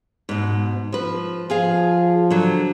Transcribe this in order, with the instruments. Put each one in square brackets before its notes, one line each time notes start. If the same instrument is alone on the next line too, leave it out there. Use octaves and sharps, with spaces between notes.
[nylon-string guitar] G#2 B2
F3 B4
[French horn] F3 [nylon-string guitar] F4 G#4 F5
[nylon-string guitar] D3 F#3